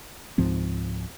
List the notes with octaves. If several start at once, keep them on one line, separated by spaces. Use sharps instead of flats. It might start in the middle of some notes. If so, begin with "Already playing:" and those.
C#2 G#2 F3 C4